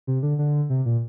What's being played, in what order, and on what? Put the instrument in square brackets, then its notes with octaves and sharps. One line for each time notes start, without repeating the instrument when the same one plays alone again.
[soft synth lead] C3
D3
D3
C3
A#2